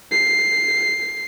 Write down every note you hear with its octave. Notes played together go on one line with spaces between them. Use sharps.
C7